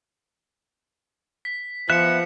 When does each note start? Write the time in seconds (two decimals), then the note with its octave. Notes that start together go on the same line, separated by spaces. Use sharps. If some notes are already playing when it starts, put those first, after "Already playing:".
1.45 B6
1.90 F3 B3 E5 F#6 C#7 E7